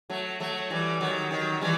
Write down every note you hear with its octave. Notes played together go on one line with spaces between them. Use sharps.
F#3 A3
F#3 A3
E3 G3
D#3 F#3
D#3 F#3
E3 G3